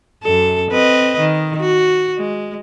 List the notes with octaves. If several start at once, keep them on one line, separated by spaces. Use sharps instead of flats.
F#2 A4
C4 B4 D#5
D#3
F#4
G#3